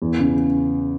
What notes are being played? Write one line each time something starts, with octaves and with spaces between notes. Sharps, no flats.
E2
C#3